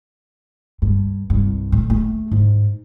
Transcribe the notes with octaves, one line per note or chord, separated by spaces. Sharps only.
G2
C2 G2
A2
A3
G#2